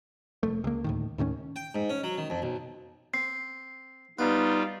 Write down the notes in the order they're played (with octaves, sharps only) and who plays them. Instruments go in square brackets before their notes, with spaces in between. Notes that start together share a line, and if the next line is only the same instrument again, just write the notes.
[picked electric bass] F1 A3
C#2 A#3
D2 A2 D#3
D#2 A2 D#3 C#4
[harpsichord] G5
G#2
C#4
F#3
D#3
F2
B1
[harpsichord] C4 [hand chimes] C7
[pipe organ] G3 F4 [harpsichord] B3 [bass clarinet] D#4